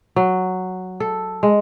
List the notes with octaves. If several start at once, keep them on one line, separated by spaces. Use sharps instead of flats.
F#3
A4
G#3